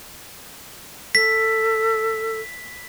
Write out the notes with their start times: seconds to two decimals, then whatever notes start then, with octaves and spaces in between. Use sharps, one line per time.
1.15 A4 B6